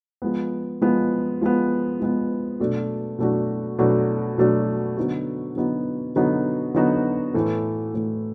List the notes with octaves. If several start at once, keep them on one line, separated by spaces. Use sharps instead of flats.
F3 G#3 B3
F3 G#3 B3
F3 G#3 B3
F3 G#3 B3
B2 F#3 A3 D4 F#4
B2 F#3 A3 D4 F#4
B2 F#3 A3 D4 F#4
B2 F#3 A3 D4 F#4
D3 F#3 B3 D#4 F#4
D3 F#3 B3 D#4 F#4
D3 F#3 B3 D#4 F#4
D3 F#3 B3 D#4 F#4
A2 E3 A3
A2 E3 A3